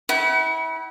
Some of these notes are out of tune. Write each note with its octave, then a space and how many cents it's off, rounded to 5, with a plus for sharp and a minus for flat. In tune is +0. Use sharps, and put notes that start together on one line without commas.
E4 -30 F#5 +35